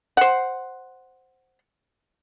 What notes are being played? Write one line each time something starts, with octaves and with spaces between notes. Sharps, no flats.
C5 F#5